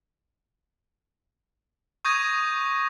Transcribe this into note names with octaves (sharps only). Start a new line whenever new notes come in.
C#6 D#6 G6 G#6 A#6 D#7